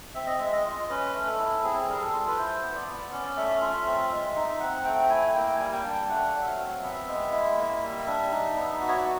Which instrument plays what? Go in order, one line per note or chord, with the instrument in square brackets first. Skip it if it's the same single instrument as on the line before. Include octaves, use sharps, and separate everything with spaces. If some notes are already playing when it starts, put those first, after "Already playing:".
[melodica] C4 E5
D#5
G#3 E5
D#5
F4
C#4 B4
A3
A4
E4
C4 G#4
G3 A#4
A4
F4
B4
E4 C5
B3
D5
B3
C#4 D5
A3 E5
F4 E5
C4
G#3
D#4
C4 F#5
A3 G5
E4 G#5
A#3 G5
G#5
G3
G5
D4
G5
A3 F#5
F#3
E5
F5
C4
B3 E5
G#3
E4
A#3
G3
D4
D#4
B3
F#4
C#5
D5